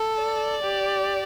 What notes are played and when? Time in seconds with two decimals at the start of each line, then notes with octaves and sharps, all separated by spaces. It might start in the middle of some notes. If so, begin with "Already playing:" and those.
Already playing: A4
0.23 D5
0.63 G4